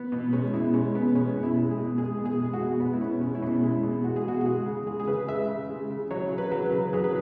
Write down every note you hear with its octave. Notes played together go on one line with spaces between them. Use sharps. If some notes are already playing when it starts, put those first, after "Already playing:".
Already playing: B3
B2
G#3 C#4
B2 E4
G#3 C#4
B2 B3
G#3 C#4
B2
E4
G#3
G#4
B2
G#3 G#4
B2
G#4
G#3
F#4
B2
G#3 B3
E4
B2 C#4
G#3 C#4
E4
B2 C#4
G#3 E4
B2
G#3 F#4
G#4
B2 F#4
F#4
G#3 G#4
C#3
G#3 G#4
G#4
C#3 B4
G#3 E5
C#3
G#3
C#3
F#3 C#5
C#3
B4
F#3
B4
C#3
F#3 G#4
B4